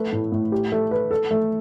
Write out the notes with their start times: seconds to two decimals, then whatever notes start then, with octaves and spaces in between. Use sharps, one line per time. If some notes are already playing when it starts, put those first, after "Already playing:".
Already playing: A3 B4
0.12 A2
0.32 A2
0.52 G4
0.72 A3
0.91 B4
1.11 A4
1.31 A3